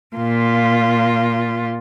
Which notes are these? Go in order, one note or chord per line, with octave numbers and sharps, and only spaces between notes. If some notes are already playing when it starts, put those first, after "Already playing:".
A#2 F4